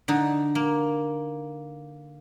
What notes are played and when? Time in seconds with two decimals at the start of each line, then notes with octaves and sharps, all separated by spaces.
0.08 D3 D#4
0.55 A#3